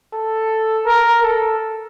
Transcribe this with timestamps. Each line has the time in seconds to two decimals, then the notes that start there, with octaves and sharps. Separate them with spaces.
0.13 A4
0.86 A#4
1.23 A4